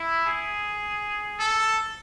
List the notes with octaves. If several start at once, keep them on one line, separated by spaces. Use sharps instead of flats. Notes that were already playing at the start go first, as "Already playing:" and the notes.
Already playing: E4
G#4
A4